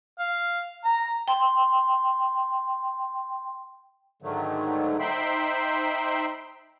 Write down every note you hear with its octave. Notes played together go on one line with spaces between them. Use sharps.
F5
A#5
G5 C6
G#2 D3 D#3 F#3 A3
D#4 C5 E5 G5 B5 C6